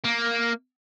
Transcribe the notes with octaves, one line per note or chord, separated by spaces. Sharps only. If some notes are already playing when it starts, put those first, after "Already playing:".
A#3